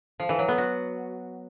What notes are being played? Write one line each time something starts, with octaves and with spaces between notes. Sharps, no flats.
F3
E3
F#3
B3
F#4